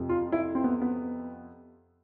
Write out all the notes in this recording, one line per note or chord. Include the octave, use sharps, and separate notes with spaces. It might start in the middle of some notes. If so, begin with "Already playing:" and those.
Already playing: F2 C3 F3
F4
E4
C4
B3
B3